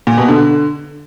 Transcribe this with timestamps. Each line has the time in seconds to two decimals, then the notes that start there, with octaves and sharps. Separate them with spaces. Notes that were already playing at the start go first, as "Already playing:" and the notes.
0.07 A#2
0.18 B2
0.28 D3